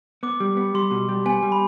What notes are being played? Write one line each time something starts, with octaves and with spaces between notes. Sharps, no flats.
B3 D6
G3
B3
G3 C6
B2
G3
B3 G#5
G3
B5